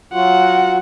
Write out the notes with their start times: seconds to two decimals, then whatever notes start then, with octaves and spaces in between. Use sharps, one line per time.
0.13 F#3 F4 F#4 F#5